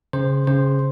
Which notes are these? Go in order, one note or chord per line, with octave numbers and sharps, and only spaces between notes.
C#3 C5
C#3 C5